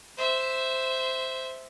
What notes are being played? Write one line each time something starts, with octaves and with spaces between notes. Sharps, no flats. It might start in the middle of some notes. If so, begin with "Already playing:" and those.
C5 E5